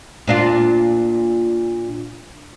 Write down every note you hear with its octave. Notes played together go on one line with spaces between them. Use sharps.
A#2 D4 F4